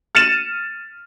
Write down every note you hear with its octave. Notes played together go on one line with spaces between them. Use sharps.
F6 A6 C#7 D#7 E7